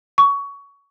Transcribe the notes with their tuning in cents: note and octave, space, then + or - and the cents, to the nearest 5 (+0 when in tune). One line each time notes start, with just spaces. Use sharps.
C#6 +20